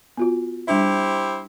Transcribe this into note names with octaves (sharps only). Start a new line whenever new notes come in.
B3 F4 F#4
G3 D4 E4 G4 C5 E5